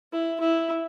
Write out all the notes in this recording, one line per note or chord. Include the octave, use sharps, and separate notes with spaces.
E4
E4